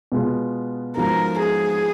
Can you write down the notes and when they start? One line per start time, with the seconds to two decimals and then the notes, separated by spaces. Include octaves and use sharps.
0.12 B2 G#3 B3 F4
0.97 G#2 F3 G#3 B3 F#4 A#4
1.39 G#4